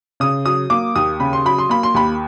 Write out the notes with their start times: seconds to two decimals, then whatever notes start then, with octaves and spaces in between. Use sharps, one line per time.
0.20 C#3 D#6
0.45 F#3 D#6
0.70 A#3 D6
0.96 D#2 D#6
1.20 C#3 B5
1.33 C6
1.45 F#3 B5
1.58 C6
1.69 A#3 B5
1.83 C6
1.94 D#2 B5